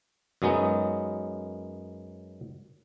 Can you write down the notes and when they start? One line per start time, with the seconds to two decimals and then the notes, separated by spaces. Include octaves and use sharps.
0.42 F#2 F#3 G#3 B3 D#4